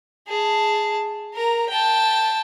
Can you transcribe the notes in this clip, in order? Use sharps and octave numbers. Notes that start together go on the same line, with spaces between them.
G#4 A5
A#4 A#5
G5 A5